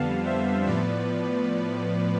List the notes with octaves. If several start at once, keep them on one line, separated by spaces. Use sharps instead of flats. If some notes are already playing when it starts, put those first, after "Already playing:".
Already playing: F2 D3 G3 B3 F5 A5
C5 E5
A2 F3 B3 B4 D5